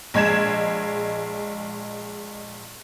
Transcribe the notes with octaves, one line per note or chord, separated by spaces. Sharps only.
A#1 G#3 G#6 E7